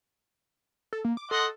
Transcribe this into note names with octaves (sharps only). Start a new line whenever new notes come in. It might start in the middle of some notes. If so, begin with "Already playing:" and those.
A4
A#3
D6
A4 D#5 F#5 C6